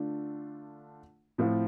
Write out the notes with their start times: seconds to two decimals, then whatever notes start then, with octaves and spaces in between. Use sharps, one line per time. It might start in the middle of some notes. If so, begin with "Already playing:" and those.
Already playing: D3 A3 D4 F4
1.38 A2 F3 C4 F4